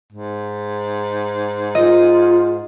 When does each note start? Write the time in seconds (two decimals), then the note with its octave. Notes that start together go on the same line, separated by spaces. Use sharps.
0.13 G#2
1.75 F4 D#5